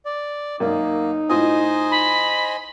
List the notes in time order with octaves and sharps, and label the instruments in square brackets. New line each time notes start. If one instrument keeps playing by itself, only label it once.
[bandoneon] D5
[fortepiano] F#2 [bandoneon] A#3 [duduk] D#4
[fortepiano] A2 F4 D#6 [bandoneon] C5 D#5 G#5
[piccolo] B5